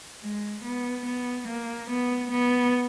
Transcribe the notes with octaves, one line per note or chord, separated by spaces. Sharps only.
G#3
B3
B3
A#3
B3
B3